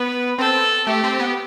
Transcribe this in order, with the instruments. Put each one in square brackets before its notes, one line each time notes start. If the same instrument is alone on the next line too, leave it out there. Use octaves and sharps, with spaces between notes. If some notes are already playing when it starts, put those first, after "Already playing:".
Already playing: [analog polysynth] B3 [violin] B4
[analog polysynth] C4 [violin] A4
[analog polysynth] A3 [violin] G4
[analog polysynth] C4
B3